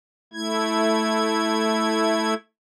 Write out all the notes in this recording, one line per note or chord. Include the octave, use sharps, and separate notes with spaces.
A3 E4 G#6